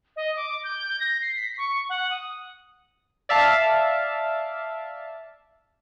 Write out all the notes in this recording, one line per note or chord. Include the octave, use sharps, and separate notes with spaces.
D#5
D6
G6
A#6
C7
B6
C#6
F#5
D#6
D5 E5 F5 A5